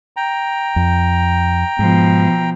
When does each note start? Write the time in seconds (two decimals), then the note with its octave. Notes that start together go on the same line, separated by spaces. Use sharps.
0.17 G5 A#5
0.76 F2
1.79 G#2 B2 F3